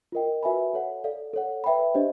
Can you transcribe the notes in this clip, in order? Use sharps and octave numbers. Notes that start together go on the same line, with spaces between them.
F4 A#4 D#5 G5
F#4 B4 E5 G#5 B5
A4 C#5 F#5
A4 D5 F5
A4 C#5 F#5
B4 E5 G5 B5
D4 G4 C5 D#5